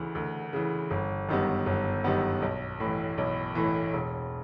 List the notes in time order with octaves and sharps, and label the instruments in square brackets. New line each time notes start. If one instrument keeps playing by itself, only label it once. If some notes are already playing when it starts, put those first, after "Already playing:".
Already playing: [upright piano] D2 C#3 E3
D2
C#3 E3
G1
F#2 D#3 G3 B3
G1
F#2 D#3 G3 B3
B1
A2 E3
B1
A2 E3
E1